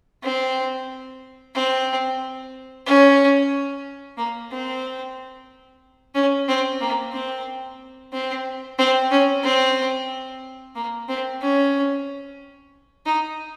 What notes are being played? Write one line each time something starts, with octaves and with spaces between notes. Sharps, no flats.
C4
C4
C#4
A#3
C4
C#4
C4
A#3
C4
C4
C4
C#4
C4
A#3
C4
C#4
D#4